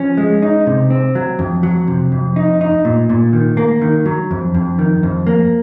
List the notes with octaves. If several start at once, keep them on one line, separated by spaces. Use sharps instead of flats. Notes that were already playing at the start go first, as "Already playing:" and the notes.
Already playing: F3 C#4
G#3
D#4
C3
C4
F#3
F2
F#3
C3
F2
D#4
D#4
A#2
A#2
D#3
A#3
D#3
F#3
F2
F2
D#3
F2
A#3